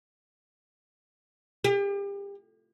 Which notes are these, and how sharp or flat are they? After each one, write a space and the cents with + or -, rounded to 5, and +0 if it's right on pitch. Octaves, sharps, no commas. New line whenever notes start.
G4 +35